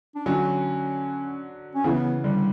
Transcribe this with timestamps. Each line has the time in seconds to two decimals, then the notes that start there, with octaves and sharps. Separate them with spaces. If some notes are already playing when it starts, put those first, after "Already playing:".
0.15 D4
0.26 D3 F#3 C#4
1.75 C#4
1.84 C#3 E3 B3
2.24 D3 G3